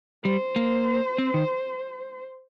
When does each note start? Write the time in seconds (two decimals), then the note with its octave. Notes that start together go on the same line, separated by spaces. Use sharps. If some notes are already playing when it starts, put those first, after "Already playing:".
0.25 G3 C5
0.56 A#3
1.18 C4
1.34 D#3